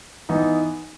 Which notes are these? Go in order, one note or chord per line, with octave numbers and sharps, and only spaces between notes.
E3 B3 D#4